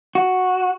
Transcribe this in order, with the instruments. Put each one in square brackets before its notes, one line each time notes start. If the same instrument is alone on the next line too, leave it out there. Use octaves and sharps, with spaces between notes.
[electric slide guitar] F#4